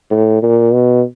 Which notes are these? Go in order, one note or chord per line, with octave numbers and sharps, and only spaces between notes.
A2
A#2
B2